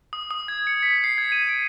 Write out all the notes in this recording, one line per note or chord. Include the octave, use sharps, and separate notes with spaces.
D#6
D#6
G#6
C#7
B6
C7
G#6
D#7
D7